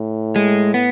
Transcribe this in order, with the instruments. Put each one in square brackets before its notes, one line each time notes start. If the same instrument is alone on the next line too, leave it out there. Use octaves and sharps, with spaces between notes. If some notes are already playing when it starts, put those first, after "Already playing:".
Already playing: [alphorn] A2
[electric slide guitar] G#3
B3